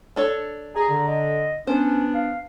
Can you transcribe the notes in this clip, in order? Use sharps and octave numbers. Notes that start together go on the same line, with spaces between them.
D4 A4 C#5
G#4 A#5
D3
D#5
B3 C#4 D4 C5
F5